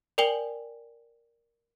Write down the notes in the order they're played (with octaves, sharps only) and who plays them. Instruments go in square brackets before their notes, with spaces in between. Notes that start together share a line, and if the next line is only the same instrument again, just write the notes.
[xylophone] A#4 D5 G5 G#5 F#7 G7